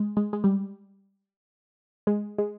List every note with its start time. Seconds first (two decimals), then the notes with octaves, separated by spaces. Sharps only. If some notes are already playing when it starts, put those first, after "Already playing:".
Already playing: G#3
0.17 G#3
0.33 G#3
0.44 G3
2.07 G#3
2.38 G#3